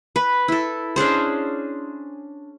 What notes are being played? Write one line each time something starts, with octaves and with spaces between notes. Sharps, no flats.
B4
E4 A4
C#4 D4 G#4 C5